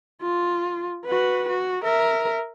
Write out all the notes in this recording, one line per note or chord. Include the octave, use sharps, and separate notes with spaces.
F4
F#4 B4
F#4
A#4 E5